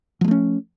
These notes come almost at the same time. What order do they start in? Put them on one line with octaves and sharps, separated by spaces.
F3 G#3 A3 C#4